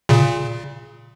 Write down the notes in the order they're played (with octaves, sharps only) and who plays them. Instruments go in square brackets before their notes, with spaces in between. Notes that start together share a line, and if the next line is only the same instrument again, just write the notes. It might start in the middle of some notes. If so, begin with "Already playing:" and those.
[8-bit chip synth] A#2 C#3